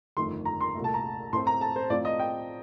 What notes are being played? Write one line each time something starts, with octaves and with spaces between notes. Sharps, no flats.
G1 F2 D#3 A3 C6
A#5
C6
C2 A#2 A3
A5
A#5
A2 A3 C4 C6
A#5
A5
C5
A2 F3 C4 F4 D5
D#5
G5